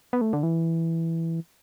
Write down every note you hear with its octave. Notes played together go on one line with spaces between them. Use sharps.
B3
A3
D3
E3